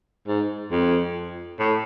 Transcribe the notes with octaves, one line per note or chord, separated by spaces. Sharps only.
G#2
F2
A2